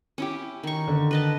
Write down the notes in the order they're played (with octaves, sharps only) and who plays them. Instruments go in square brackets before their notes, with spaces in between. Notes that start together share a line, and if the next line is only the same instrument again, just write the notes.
[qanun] C#4 E4 G4
D#3 C#6
[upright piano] D3
[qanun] B4 D#5 A5